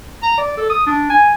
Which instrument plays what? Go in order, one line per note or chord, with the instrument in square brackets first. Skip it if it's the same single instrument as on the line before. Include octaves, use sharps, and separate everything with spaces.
[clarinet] A#5
D5
A4
D#6
D4
G#5